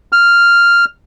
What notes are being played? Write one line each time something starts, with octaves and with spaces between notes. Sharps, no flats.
F6